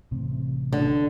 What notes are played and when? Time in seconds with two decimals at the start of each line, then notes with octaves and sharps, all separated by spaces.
0.11 A1 C3 C4
0.73 D3